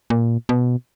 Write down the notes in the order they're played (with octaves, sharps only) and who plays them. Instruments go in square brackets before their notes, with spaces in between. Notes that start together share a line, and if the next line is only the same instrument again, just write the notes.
[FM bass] A#2
B2